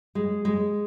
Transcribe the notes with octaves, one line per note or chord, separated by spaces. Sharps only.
G#3
G#3